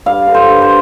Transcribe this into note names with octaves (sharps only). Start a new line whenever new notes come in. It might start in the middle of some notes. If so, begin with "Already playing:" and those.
G2 F5
D3
C5
G2
C5